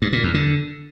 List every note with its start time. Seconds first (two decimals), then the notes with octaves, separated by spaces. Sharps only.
0.02 G2
0.13 A#2
0.23 E2
0.34 D3